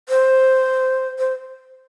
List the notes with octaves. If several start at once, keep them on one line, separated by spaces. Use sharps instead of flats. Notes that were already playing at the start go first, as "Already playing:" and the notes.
C5
C5